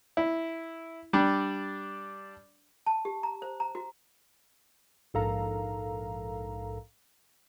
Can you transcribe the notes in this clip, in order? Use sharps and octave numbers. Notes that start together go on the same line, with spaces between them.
E4
G3 D4
A5
G4
A#5
C5
A#5
F#4
A#1 G#2 A4 A#4 F5 A#5